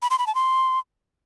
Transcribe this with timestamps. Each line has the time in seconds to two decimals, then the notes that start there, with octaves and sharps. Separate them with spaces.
0.02 B5
0.10 C6
0.19 B5
0.27 A5
0.35 C6